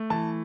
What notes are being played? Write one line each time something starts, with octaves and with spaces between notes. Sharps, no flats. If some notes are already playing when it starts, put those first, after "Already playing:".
Already playing: A3
E3 A5